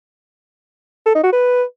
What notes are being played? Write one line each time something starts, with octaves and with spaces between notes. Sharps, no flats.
A4
D#4
F#4
B4